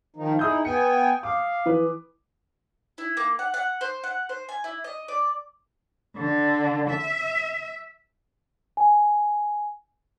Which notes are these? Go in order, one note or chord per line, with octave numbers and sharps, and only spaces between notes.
D#3 F3 D#4
D#4 E4 G#4 D#6 G6
B3 G5 G#5 C#7
F5 D6
E3 B4
E4
A#3
F#5
F#5
C5
F#5
C5
G#5
E4
D#5
D5
D3
E5
G#5